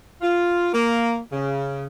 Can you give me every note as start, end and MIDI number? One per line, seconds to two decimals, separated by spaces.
0.22 0.68 65
0.73 1.18 58
1.32 1.85 49